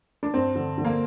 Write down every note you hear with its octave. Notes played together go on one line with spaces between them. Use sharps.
D4
G2 C4
D3
D3
A#3